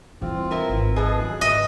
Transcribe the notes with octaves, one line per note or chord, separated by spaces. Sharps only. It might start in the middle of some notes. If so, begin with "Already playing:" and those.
G2 E3 C4 F4
E4 A#4 B4
G#1
F3 G#4 A4 B4 D#5
F#2 D#3 F#6
G#2 B4 D#5 E5